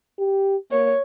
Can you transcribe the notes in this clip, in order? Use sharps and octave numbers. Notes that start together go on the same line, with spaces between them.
G4
A#3 C#5